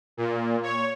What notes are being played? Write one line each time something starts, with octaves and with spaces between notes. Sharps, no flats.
A#2
C#5